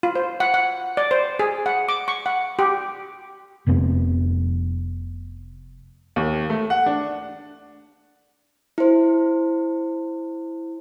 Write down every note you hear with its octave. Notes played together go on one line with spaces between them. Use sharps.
F4
C5
F#5
F#5
D5
C5
G#4
F#5
D6
C#6
F#5
G4
F1 F2 C3 B3
D#2
A3
F#5
D4
E4 C5